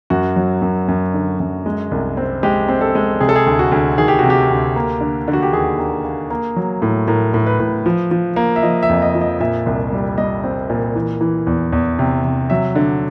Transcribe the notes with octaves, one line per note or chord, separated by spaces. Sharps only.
F#2 F#4
F#3
F#2
F#2
D3
F#2
G#3
C2
C4
G#3 G4
C4
A4
G#3
C3 G#4
A4
G#4
D2
F#4
D2
D#3 G#4
G4
C3 F#4
G4
D2
A#3
D3
D3
F#4
G4
D#2 G#4
A#3
A#3
A#3
F#3
A2
A2 A#4
A2
B4
A2
F3
F3
A#3
E5
F3 D#5
E5
F2
D#5
F3
D#5
A#2 E5
C2
G3
G3 D#5
C4
A#2
E3
E3
E2
E2
C3
C3
F#3 E5
D3